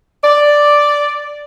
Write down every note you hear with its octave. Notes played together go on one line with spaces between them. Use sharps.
D5